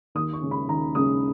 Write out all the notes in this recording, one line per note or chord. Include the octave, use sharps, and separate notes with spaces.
D#2 D#6
C#6
C#3 G#3 C#4
B5
D#2 A#5
C#3 G#3 C#4 D#6